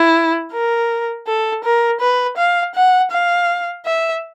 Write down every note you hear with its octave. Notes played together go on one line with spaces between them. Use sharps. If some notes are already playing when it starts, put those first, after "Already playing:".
Already playing: E4
A#4
A4
A#4
B4
F5
F#5
F5
E5